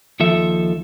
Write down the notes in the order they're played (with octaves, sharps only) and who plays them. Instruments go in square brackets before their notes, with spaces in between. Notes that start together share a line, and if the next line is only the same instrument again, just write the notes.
[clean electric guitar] D#2 F3 A4 E5